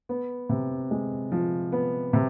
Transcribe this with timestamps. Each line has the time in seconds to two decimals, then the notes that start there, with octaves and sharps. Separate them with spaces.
0.09 B3
0.49 C3
0.91 G#3
1.32 F3
1.72 B3
2.13 C3